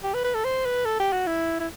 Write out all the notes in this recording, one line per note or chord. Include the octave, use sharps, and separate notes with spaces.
G4
B4
B4
A4
C5
B4
A4
G4
F#4
E4
E4